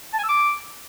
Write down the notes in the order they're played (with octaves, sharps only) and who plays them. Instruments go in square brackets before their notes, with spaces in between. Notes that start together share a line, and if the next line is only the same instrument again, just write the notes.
[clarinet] A5
G#5
E6
D6